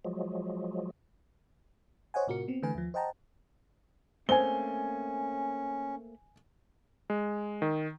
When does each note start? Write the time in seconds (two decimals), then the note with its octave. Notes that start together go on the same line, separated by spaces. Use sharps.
0.05 F3 F#3 G#3
2.14 C5 C#5 D#5 F#5 G#5
2.27 A2 C3 F4 F#4 A#4 C#7
2.48 B3 C4
2.62 D3 E3 A3 B4 G#5
2.74 D#2 F3
2.94 C5 D#5 F#5 G5 A5 A#5
4.29 A3 A#3 C4 C#4 C5 G#5 G7
7.10 G#3
7.62 D#3